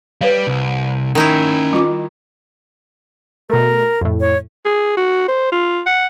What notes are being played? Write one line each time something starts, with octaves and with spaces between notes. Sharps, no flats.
G3 B4 C#5 F5
C2
D#3 C#4 D#4 E4 G5
G3 F4 D6
B2 A3 A#4
F2 A2
C#5
G#4
F#4
C5
F4
F#5